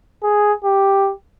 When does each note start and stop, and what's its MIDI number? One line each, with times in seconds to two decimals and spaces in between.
0.24 0.53 68
0.65 1.12 67